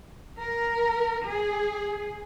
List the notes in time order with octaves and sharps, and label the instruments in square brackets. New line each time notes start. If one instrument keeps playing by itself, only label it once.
[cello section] A#4
G#4